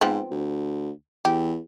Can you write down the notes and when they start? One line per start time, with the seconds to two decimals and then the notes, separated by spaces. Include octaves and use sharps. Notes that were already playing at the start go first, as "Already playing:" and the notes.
0.01 G#2 F3 B3 C4
0.31 D2
1.25 E2 G4